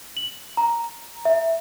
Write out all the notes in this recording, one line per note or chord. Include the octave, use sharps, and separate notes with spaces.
F#7
A#5
E5